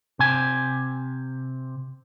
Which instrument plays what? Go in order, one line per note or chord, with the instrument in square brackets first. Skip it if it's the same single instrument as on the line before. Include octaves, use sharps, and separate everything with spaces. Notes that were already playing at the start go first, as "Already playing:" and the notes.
[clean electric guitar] C3 G#5